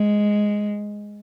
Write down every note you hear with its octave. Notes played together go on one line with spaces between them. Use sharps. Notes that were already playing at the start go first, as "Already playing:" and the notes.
Already playing: G#3